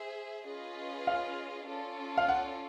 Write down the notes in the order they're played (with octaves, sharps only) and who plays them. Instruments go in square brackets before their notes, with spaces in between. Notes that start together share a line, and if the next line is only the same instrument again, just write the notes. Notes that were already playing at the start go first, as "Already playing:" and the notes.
Already playing: [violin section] G#4 C5 E5
C#4 F4 G#4 B4 D#5
[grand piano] F5
[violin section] C#4 F4 A4 D5
[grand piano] F5
F#5